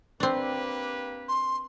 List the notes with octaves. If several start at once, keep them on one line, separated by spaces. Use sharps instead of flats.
A#3 C4 D4 G4 B4
C6